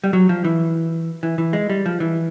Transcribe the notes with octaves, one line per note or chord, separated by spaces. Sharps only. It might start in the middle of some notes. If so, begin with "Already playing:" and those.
G3
F#3
F3
E3
E3
E3
G#3
G3
F3
E3